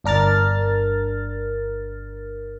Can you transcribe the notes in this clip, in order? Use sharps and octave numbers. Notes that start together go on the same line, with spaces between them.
G1 D4 A#4 F6 A6